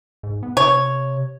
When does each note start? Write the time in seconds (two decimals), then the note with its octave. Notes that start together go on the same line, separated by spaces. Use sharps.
0.23 G#2
0.43 B3
0.57 C3 C#5